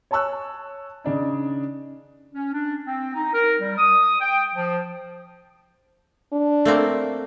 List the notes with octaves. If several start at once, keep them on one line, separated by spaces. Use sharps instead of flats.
C#5 G#5 A5 C#6 E6 F#6
C#3 D4 D#4
C#4
D4
C4
D#4
A#4
G3
D#6
G5
F3
D4
A3 A#3 C4